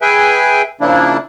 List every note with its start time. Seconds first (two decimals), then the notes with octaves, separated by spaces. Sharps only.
0.02 G#4 B4 E5 G5 G#5
0.81 C#3 F3 A#3 D4 E4